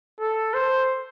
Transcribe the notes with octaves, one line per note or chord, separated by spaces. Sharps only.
A4
C5